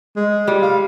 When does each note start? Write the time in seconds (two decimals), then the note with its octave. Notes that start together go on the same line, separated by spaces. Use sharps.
0.16 G#3
0.47 G3
0.62 F5